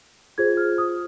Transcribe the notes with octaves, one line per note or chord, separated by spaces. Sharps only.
F4 G#4 C5 G#6
F6
D#6